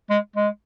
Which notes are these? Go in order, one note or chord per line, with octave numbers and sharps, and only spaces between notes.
G#3
G#3